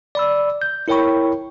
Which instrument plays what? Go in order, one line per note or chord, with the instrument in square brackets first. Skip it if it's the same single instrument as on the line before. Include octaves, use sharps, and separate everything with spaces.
[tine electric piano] D5 B5 E6
G6
E4 A#4 C#5 G5 B5 C#6